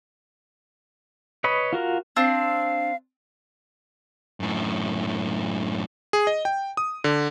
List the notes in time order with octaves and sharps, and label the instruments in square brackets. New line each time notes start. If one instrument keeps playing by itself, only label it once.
[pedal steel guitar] B4 C#5 D#5 B5
F4 F#4 A#4
[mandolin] C4 D4 [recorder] F5
[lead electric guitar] F#2 A2
[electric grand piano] G#4
D#5
G5
D#6
D3